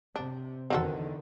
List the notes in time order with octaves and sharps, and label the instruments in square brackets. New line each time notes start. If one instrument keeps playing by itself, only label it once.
[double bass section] C3 [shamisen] D4
[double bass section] E2 D3 D#3 [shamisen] C4 F#4 A4